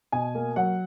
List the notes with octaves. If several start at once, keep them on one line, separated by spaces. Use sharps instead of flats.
B2 G#5
A#3
F#3 F#5